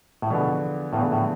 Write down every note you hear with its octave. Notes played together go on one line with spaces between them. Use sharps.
A2
E2 B2 D3 F3 B3 F4
E2 A2 D3 F3 B3 F4
A2